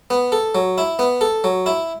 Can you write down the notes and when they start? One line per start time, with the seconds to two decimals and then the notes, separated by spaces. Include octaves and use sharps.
0.10 B3
0.32 A4
0.55 F#3
0.78 E4
0.99 B3
1.21 A4
1.44 F#3
1.66 E4